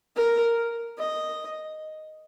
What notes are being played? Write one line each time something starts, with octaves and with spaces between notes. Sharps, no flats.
A#4
D#5